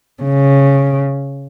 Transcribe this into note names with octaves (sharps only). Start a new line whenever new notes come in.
C#3